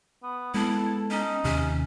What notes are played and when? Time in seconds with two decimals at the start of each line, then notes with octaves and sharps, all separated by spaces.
0.23 B3
0.54 G#3 B3 E4 A4
1.11 C#4 D#4
1.44 D#2 C3 C#4